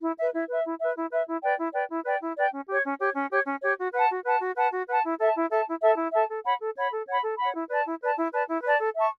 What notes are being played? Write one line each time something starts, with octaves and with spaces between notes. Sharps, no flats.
E4
B4 E5
E4
B4 E5
E4
B4 E5
E4
B4 E5
E4
B4 D5 G5
E4
B4 D5 G5
E4
B4 D5 G5
E4
B4 D5 G5
C#4
G4 C#5
C#4
G4 C#5
C#4
G4 C#5
C#4
G4 C#5
F#4
B4 F#5 A5
F#4
B4 F#5 A5
F#4
B4 F#5 A5
F#4
B4 F#5 A5
E4
A4 E5 A5
E4
A4 E5 A5
E4
A4 E5 A5
E4
A4 E5 A5
A4
C#5 F#5 B5
A4
C#5 F#5 B5
A4
C#5 F#5 B5
A4
C#5 F#5 B5
E4
B4 D5 A5
E4
B4 D5 A5
E4
B4 D5 A5
E4
B4 D5 A5
A4
E5 A5 C#6